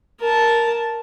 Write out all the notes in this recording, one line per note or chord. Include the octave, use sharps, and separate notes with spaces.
A#4 A5